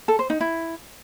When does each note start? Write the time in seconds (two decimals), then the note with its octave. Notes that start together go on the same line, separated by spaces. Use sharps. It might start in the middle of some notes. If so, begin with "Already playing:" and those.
0.08 A4
0.19 C5
0.30 D#4
0.41 E4